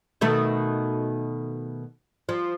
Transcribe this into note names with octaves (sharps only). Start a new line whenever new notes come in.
B2 D#3 A3
F3